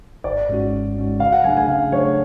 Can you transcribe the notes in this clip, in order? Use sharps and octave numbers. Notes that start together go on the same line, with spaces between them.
G#1 D5
G#2 G#3 C#4 F#4
G#1
G#2 G#3 C#4 F#4
C#3 F5
F#5
F#3 A3 D4 G#4 G#5
G#5
C#3 F5
F#3 A3 D4 G#4 C#5